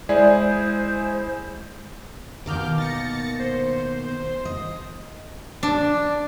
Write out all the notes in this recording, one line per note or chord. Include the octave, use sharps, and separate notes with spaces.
G#3 E4 G#4 C5 D5
B2 D#3 A#3 D6 F6 G6
A6 A#6 C#7
C5
D#5
D4